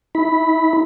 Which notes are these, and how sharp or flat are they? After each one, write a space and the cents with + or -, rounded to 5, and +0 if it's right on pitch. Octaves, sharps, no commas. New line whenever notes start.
E4 -35 B5 +0